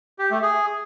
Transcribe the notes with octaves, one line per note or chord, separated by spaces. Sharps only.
G4
A3
G#4